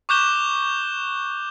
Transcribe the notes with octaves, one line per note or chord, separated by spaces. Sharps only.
C#6 D6 F#6 G6 E7 G7